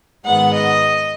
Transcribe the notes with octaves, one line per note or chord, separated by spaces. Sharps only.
G#2 D#3 G#3 B3 F#5
D#5